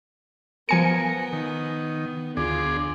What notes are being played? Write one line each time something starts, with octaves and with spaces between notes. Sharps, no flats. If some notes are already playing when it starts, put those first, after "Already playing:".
F3 B3 A#4 G#5 C#7
D#3
D2 F4 G#4 D5